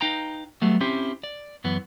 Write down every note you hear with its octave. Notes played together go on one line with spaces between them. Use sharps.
D#4 B4 F5 G5 A#5
F#3 G3 A3 B3
C4 C#4 E4 G4 C5
D5
F#2 E3 B3